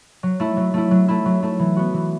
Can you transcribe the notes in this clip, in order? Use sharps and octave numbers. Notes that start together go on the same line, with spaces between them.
F#3
A3 E4
F#3
A3 E4
F#3
A3 E4
F#3
A3 E4
E3
B3 F#4
E3